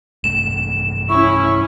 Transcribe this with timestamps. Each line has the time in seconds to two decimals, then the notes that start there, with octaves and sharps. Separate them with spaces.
0.24 G2 C3 A3 E7
1.09 C#4 E4 C#6